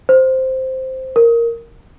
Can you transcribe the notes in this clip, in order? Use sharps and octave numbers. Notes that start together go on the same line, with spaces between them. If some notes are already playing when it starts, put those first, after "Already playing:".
C5
A#4